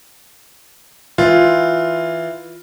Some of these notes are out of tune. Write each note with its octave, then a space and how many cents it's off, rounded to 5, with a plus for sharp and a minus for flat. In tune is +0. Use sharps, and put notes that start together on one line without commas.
E3 +0 F4 +0